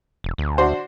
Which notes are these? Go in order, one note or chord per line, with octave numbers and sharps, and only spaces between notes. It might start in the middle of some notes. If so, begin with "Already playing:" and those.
E1
D2
D4 F#4 C5